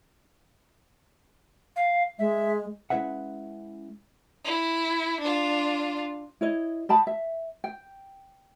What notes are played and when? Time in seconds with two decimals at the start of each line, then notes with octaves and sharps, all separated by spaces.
1.76 F5
2.19 G#3 E5
2.90 G#3 C#4 E4 B4 E5 F#5
4.44 E4
5.20 D4 F4
6.41 E4 C#5 D#5
6.89 D#5 G5 A5 B5
7.07 E5
7.64 G5